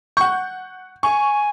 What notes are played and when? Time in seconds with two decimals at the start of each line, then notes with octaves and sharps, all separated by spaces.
0.17 F#5 C#6 G6
1.03 G#5 C#6